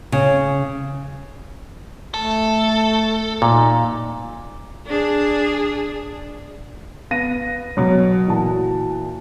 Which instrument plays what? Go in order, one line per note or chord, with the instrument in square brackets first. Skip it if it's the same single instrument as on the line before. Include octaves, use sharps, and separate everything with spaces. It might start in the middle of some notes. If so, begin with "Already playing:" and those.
[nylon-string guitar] C#3
[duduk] A3 [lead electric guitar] A4
[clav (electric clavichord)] A#2 [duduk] D#4
[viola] D4 G#4
[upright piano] B3 F5 A#6 D#7
B2 F#3
A#2 E3 F#4 A5